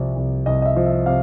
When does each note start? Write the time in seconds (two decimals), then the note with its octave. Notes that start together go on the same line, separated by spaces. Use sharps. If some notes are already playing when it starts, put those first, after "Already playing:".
Already playing: C2 C3 F3 D5
0.16 C2
0.46 C2 D#5
0.62 D#5
0.66 E5
0.76 F3
0.86 E5
1.06 C3 F5